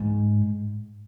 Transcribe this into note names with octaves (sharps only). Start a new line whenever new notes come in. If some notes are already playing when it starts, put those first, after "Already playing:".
Already playing: G#2